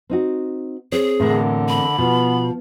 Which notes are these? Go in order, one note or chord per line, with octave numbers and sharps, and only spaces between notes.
C4 D#4 F#4
C4 G#4 C#5
E2 A2 D3 C4 A#4
B5
B2 F3 B3